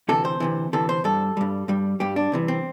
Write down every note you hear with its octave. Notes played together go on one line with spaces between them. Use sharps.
D2 C3 E3 A4
C5
D2 C3 E3
D2 C3 E3 A4
C5
G2 G3 A4
G2 G3
G2 G3
G2 G3 G4
D4
C2 C3 E3
C4